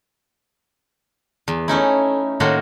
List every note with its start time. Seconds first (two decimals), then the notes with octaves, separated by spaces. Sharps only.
1.48 E2
1.68 A3 C#4 D#4 E4
2.40 A2 D#3 A#3 F#4 A4 C6